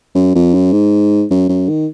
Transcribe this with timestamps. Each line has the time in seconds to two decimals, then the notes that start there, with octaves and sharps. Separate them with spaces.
0.15 F#2
0.35 F2
0.54 F#2
0.72 G#2
1.30 F#2
1.49 F#2
1.69 D#3